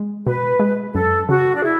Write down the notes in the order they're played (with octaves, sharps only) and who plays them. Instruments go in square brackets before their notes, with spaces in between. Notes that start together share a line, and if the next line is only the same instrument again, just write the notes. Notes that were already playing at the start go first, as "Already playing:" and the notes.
Already playing: [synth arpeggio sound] G#3
[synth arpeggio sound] B2 [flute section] B4
[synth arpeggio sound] G#3
[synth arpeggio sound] F#2 [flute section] A4
[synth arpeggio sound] C#3 [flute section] F#4
[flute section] D4
[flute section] E4 [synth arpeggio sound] G#4